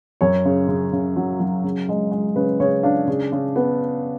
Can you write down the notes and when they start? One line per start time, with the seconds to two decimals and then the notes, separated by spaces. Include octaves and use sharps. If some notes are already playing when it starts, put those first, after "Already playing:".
0.21 F#2 C#5
0.45 C#3
0.68 C#3
0.93 C#3
1.16 F#3
1.40 F#3
1.64 C#3
1.89 G#3
2.12 G#3
2.36 C#3 B4
2.60 C#3 C#5
2.83 D4 F5
3.08 C#3
3.32 C#3
3.56 B3